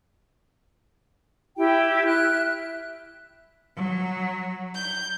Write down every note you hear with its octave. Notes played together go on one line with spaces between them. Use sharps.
E4 G4 G5
E5 F6 F#6
F#3
G6